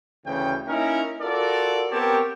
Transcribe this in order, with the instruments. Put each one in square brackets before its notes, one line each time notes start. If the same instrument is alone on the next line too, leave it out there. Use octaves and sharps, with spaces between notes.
[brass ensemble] D2 C#3 E3 C#4 G5
A#3 C#4 D#4 E4 A#4
F4 F#4 A4 A#4 D5
B3 C4 G4 A#4 C#5 A5